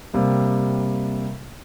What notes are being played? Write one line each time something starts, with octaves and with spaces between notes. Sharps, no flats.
C3 G3 A#3